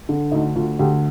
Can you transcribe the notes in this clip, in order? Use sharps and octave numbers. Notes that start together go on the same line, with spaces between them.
D3
D2 D#4
D2 F4
D2 G4